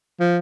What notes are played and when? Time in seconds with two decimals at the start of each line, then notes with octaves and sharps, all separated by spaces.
0.20 F3